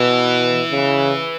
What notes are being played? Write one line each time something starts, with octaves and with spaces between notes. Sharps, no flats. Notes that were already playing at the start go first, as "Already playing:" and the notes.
Already playing: B2 E3
C#3